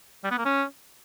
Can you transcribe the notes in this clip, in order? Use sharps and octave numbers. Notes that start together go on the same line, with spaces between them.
G3
B3
A#3
C#4